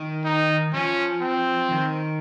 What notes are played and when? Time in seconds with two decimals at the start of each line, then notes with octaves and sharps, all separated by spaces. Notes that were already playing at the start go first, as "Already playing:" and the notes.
Already playing: D#3
0.24 D#4
0.73 F3 C#4
1.21 C4
1.71 D#3